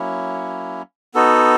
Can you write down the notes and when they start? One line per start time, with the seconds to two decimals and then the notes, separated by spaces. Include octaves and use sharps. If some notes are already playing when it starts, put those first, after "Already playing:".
Already playing: F#3 A#3 C#4 E4
1.14 B3 D#4 F#4 A4